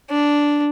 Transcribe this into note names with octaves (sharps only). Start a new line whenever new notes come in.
D4